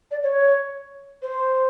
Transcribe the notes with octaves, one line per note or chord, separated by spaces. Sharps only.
D5
C#5
C5